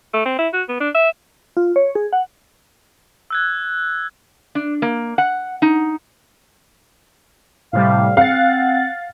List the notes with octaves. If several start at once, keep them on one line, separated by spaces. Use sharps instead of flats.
A3
C4
E4
F#4
B3
D4
E5
F4
C#5
G#4
F#5
E6 F#6 G#6
D4
A#3
F#5
D#4
A2 C3 G3 F5
C4 F5 F#5 A6